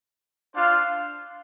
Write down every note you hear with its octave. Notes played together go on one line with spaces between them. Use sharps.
D4 F4 C5 F5